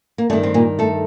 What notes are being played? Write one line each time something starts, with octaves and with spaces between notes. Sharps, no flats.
A#3
G2 D#3 A3
C4
A#2 A#3
A3 A4